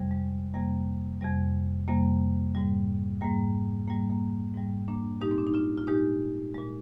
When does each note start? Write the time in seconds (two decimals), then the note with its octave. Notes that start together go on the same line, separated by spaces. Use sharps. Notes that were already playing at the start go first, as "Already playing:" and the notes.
Already playing: F2 C3 G3
0.11 G#3
0.54 F2 C3 G3 A#3
1.21 F2 C3 G3
1.88 F2 C3 G3 A#3
2.55 G#2 G3
3.21 G#2 G3 A#3
3.87 G#2 G3 A#3
4.10 A#3
4.54 G#2 G3
4.88 A#3 D4
5.21 A#2 G#3 D#4 G4
5.31 C4
5.38 D4
5.47 D#4
5.54 D4 F4
5.78 F4
5.87 A#2 G#3 D#4 G4
6.54 A#2 G#3